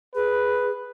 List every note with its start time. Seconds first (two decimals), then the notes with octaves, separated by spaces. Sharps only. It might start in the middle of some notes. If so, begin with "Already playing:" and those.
0.15 G#4 B4